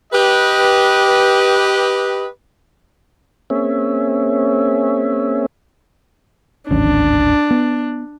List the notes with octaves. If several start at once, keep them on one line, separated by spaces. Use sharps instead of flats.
G4 B4 D#5
A#3 C4 C#4 G#4 C#5 E5
D1 G#1 C#4 D4
B3